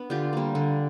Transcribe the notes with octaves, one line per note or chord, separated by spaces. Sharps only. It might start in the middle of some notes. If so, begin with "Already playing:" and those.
Already playing: B3 D4
D3 F4 G4
G3 A#3
D3